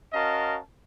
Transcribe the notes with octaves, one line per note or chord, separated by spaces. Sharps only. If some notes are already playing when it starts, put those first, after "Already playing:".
C#4 F#4 A#4 D#5 F5 A5